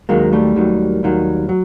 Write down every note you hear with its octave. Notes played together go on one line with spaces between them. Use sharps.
D#2 D#3 F#3 G#3 A#3
G3 A3
D#2 D#3 F#3
D#2 D#3 F#3
F#3